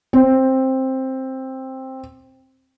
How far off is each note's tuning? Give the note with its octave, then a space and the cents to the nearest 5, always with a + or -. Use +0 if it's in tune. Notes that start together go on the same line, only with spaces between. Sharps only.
C4 +10